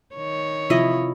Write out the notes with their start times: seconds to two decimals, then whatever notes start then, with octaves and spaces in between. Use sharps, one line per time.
0.15 D#3 C#5
0.70 C3 F3 E4 F4 D#5 E5